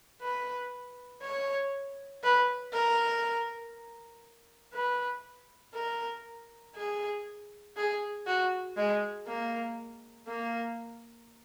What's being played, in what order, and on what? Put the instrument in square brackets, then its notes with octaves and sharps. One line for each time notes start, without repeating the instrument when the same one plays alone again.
[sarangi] B4
C#5
B4
A#4
B4
A#4
G#4
G#4
F#4
G#3
A#3
A#3